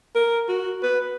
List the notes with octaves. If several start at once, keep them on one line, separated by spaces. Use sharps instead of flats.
A#4
F#4
B4